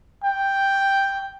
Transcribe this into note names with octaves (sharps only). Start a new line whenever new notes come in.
G5